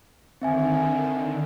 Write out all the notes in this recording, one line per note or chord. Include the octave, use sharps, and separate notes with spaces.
D3 D#3 C4 E5 G#5